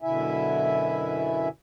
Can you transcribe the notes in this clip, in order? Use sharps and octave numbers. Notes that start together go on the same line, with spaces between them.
F#2 B2 D3 E4 E5 G#5